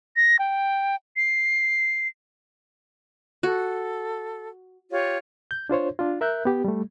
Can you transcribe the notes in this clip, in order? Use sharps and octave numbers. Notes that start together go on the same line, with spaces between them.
A#6
G5
C7
F#4 A4
F4 G4 C#5
G6
D4 F4 C5 C#5
D4 F4
A#4 E5 F#6 G6
B3 G4
G3 A3